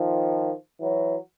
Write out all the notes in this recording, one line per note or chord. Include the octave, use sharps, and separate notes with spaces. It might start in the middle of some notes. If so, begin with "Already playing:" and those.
Already playing: D#3 F3
E3 F#3